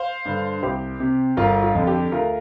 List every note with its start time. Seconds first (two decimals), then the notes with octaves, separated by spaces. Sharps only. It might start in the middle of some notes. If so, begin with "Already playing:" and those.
Already playing: C5 F5
0.25 G2 D3
0.63 C2 G4 C5
1.00 C3
1.37 G1 F4 A#4
1.63 F4
1.75 F2 D3
1.87 G4
2.12 D2 F4 A#4